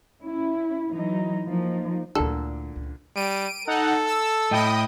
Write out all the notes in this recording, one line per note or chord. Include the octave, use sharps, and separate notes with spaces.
C#4 E4
E3 F#3 D#4
F3 A#3 D#4
D2 A#2 D3 E4 A4
C#2
G3 D7 D#7
D#4 A4 F#5
E6
A2 E4 D#5 G5 D#6